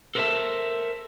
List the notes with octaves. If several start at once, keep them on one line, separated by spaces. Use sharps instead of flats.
A4 A#4 C5 D5 E5 A5